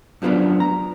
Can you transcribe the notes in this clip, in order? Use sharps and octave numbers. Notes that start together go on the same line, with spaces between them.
F#2 F3 F#3 G#3 B3 D4
A#5